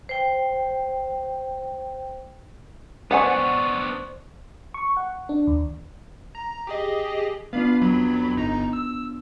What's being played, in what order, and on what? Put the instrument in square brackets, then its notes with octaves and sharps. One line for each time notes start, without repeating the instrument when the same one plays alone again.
[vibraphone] C5 G5
[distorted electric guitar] B3 D4 [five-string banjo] B4 F#5 G#5 [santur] C5 D5 C#6
[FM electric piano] C#6
F#5
D4
D#2
[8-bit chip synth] A#5
G4 G#4 D#5
[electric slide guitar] B3 D4 F4 [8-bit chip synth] F5 B5
[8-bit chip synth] F2 F#3 B5
G1 D#4 A#5
E6